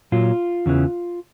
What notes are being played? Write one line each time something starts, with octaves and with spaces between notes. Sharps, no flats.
A#2 F#3 F4
E2 C#3 E3